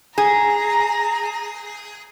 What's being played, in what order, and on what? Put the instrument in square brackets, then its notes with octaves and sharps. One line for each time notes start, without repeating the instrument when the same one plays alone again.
[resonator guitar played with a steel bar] G#4 [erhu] A#5